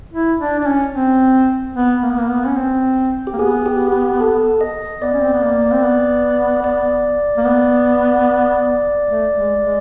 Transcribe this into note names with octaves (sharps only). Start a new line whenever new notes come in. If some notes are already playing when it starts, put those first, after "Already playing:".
E4
D4
D4
C#4
C4
B3
A#3
B3
A#3
B3
C#4
C4
G4
A#3
B3 G#4
G4
G4
A4
D#5
B3 D5
C#4
C4
B3
A#3
C4
B3
D5
A#3
B3
A3
G#3
G#3